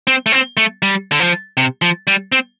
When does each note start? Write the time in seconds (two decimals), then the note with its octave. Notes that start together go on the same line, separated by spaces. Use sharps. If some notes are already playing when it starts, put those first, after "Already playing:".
0.07 C4
0.26 A3
0.32 C4
0.57 A3
0.82 G3
1.11 D3
1.20 F3
1.57 C3
1.82 F3
2.07 G3
2.32 C4